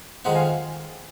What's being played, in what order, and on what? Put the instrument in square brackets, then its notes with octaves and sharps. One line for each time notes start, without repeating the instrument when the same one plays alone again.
[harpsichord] F2 D#3 G#3 C4 D#4 [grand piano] D#5 F#5
[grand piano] F5 G#5